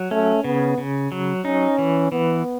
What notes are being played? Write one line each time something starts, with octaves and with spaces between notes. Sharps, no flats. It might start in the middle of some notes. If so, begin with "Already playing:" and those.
Already playing: F#3
A3 C#4
C#3 B3
C#3
F#3
C#4 D#4
E3
E3 B3